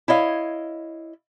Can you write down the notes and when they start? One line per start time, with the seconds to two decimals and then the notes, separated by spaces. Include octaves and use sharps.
0.08 E4 C#5 D#5 F5